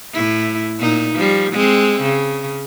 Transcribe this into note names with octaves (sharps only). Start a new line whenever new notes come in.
A2 E4
A#2 D#4
F3 G3
G#3 C4
C#3